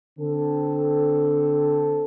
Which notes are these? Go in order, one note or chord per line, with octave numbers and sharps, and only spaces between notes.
D3 C4 A4